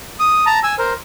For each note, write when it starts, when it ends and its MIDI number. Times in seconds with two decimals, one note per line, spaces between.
0.20 0.45 87
0.46 0.59 81
0.46 0.59 82
0.63 0.75 80
0.63 0.75 88
0.78 0.93 70
0.78 0.93 72